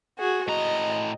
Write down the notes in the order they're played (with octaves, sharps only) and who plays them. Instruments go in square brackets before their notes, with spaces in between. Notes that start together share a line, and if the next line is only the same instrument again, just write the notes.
[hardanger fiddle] F#4 G#4
[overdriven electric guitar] A2 A#5 [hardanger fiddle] D#5